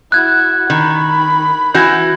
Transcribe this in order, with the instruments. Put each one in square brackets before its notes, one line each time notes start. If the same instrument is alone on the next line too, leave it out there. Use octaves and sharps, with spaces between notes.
[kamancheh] E4 F#4 [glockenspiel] F#6 G#6
[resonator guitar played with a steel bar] D#3 [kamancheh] B5
[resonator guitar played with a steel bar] E3 F#4 [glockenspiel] G6 G#6